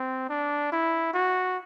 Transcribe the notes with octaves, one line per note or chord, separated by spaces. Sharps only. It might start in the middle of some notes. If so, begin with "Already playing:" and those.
Already playing: C4
D4
E4
F#4